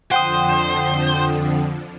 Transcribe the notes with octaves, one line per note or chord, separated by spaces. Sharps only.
F2 D3 F3 C5 F#5 G5 D#6